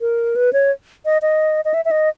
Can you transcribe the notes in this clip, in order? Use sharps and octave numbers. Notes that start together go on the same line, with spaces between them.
A#4
B4
C#5
D#5
D#5
D#5
E5
E5
D#5